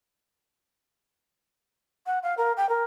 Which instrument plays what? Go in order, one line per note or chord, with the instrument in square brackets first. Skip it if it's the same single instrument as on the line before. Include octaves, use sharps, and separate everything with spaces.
[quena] F#5
F5
A#4
G5
A#4